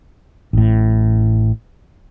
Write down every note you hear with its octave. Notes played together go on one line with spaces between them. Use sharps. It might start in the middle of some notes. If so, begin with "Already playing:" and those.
A1 A2